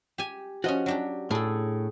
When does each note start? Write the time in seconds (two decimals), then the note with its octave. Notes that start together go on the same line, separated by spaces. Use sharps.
0.18 G4 G#5
0.64 F3 C#4 F#4 D#5
0.86 F#3 D4 G4
1.31 A2 G#4 A4